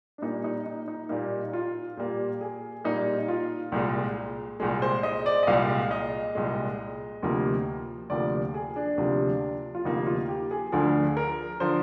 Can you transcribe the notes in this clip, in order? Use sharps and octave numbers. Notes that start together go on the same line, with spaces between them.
D4
A#2 G3 A#3 D#4
D#4
D#4
D#4
A#2 G3 A#3 D#4
F4
A#2 G3 A#3 G4
G#4
A#2 G3 A#3 D#4
F4
C2 A#2 G#3
C2 A#2 G#3 G#4
C5
D#5
D5
D#5
C2 A#2 G#3 F5
D#5
C2 A#2 G#3
D2 C3 F3 A#3
D2 C3 F3 A#3 D5
G#4
D4
D2 C3 F3 A#3
F4
D2 C3 F3 A#3 D#4
F4
G4
G#4
D2 D3 F3 G#4
A#4
D3 F3 C5